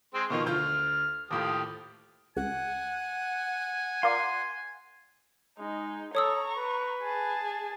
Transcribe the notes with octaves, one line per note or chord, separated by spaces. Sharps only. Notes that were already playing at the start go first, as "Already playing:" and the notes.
G#3 C4 C6
B2 D#3 F3 F4 C#6
D2 F4 F6 G6
D#2 A2 F3 G4 D#6
C#2 F#5 G#5
F4 A#4 D5 C6
G#3 D#4
A4 C#5 A#5 C#6 D#6 E6
B4
G#4 A5